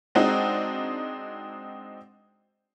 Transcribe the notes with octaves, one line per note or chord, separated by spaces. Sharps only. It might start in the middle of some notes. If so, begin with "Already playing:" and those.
G#3 C4 D4 D#4 F#4